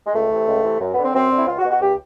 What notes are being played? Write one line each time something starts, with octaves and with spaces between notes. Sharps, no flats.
G#3
C#2 A3
C3 E3
C#2
C3 E3
F#2
B3
D3 C4
F#2 C4
D3
E4
C#2 F4
F#4
B2
F#4
C#2 G4